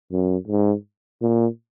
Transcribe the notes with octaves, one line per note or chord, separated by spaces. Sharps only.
F#2
G#2
A#2